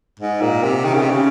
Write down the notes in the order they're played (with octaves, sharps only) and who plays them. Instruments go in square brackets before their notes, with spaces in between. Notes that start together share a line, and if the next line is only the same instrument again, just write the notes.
[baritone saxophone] G#2
A#2
C3
D#3
C#3
C3
C#3